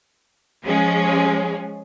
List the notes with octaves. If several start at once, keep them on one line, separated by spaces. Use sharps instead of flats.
F3 G#3 C#4 G#4